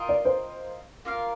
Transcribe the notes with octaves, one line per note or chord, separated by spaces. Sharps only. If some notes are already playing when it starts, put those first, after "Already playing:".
Already playing: F4 A#4 D#5 G5
D5
C5
A#3 F4 A#4 F5